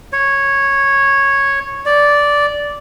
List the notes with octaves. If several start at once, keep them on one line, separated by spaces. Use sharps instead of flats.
C#5
D5